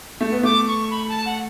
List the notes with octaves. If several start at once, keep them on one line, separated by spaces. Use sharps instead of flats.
A3
B3
A3 D6
C#6
B5
A5
F#5